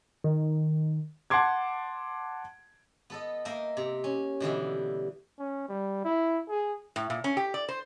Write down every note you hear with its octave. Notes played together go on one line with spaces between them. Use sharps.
D#3
F#5 A5 C6 D6 G#6
B3 A4 D#5
A#3 A#4 D#5 E5 G5
C3
C#4
B2 D3 E3 G3
C#4
G3
E4
G#4
A2
A#2
C#4
G4
D5
C5